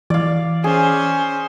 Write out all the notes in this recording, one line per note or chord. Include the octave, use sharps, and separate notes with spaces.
E3 D5 F5
C#4 G#4 C5